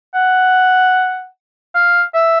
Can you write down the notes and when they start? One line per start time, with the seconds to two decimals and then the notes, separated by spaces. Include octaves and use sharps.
0.15 F#5
1.74 F5
2.14 E5